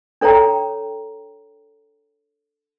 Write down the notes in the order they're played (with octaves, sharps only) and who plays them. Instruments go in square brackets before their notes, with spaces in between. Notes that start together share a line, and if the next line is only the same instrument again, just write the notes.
[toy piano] D4 A4 C#5 G5 A#5